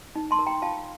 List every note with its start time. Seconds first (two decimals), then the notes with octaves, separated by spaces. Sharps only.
0.16 D#4
0.31 A5 C6
0.39 A#4
0.46 G5 A#5
0.62 F4 F5 A5